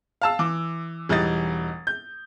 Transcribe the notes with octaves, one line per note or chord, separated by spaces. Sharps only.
F5 A5 E6
E3 D6
E1 E3 G3 D#4 D#6 A6
G6